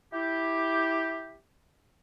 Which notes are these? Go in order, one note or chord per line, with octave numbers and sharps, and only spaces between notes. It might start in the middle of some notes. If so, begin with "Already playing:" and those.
E4 G4